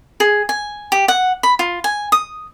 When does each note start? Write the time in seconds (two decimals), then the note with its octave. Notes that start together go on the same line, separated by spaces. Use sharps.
0.20 G#4
0.49 G#5
0.92 G4
1.08 F#5
1.43 B5
1.59 F4
1.84 G#5
2.12 D#6